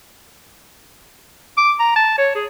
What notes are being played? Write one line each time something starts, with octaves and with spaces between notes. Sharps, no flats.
D6
A#5
A5
C#5
G#4